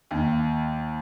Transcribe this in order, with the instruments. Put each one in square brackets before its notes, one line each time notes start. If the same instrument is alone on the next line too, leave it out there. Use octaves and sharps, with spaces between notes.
[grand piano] D#2